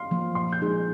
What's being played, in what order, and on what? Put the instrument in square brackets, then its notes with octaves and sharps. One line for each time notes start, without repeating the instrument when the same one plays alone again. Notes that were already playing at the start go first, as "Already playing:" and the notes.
Already playing: [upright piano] F5 C6
[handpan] F3 A#3
[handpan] A#2 [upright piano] C6
[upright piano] G6
[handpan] G#3 D#4 G#4